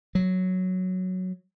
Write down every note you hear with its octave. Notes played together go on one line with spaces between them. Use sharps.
F#3